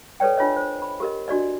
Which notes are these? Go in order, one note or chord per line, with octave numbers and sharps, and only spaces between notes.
A4 B4 C#5 D5 G5
D4 F4 C#5 D#5
C5
B5
G4 A#4 D#5
D4 F#4 D5 D#5